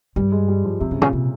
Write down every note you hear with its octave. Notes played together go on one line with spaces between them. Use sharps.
G2 G3
G#3
G3
F3
F2 C3
G2 C#3
A#2 C#3
C3